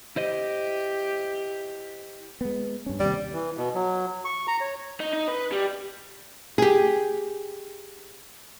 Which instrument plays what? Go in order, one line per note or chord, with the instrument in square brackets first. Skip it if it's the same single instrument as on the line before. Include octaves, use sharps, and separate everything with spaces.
[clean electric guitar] E4 C5 D#5 [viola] G4
[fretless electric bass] G#3 B3
G2 C#4
[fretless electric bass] D#2 C3 [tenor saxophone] G3
[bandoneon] E3
B2
F#3
C#6
A#5
C#5
[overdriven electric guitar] D#4
D#4
B4
G3
[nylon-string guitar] G4 G#4